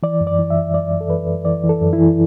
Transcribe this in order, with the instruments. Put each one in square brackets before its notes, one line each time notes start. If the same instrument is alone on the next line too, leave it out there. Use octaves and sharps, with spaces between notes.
[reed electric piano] E3 D5
F#2
D5
E3
E5
E3
F#2 D5
F#2
A4
E3 B4
F#2
E3 D5
E3
A4
F#2
E4
E3